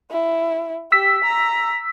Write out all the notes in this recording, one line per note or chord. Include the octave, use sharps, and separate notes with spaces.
E4
G4 E6 B6
A#5